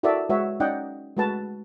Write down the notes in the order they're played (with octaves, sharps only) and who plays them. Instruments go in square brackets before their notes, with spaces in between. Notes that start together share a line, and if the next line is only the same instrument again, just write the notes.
[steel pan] E4 F#4 A4 A#4 D5 E5
G#3 F#4 B4 C#5 E5
C#4 D#4 D5 D#5 F#5 G5
G#3 A3 F#4 B4 A5